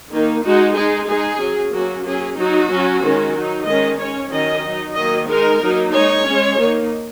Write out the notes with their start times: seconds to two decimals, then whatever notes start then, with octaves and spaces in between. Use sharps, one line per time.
0.11 D#3 A#3 D#4
0.43 G#3 D#4 F#4
0.76 G#3 D#4 G#4
1.08 G#3 D#4 G#4
1.40 F#3 C#4
1.72 F#3 A#3 C#4 F#4
2.05 F#3 C#4 G#4
2.38 F#3 D#4 F#4
2.70 F#3 C#4
3.02 D#3 G#3 C#4
3.34 F#3 D#4
3.66 D#3 G#3 C#4 D#5
3.99 G#3 C#4 C#5
4.31 D#3 F#3 C#4 D#5
4.64 F#3 D#4
4.96 D#3 F#3 A#3 D#5
5.28 G#3 D#4 A#4
5.61 F#3 A#3 D#4
5.93 G#3 D#4 C#5
6.26 G#3 C#4
6.58 D#3 A#3 D#4